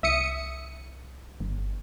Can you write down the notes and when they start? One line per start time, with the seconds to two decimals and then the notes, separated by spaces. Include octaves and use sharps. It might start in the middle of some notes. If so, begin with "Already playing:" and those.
0.03 C2 E5 D#6 C#7
1.40 G1